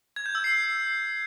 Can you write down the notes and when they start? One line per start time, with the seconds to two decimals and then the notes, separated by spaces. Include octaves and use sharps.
0.16 G#6
0.26 G6
0.35 E6
0.44 C7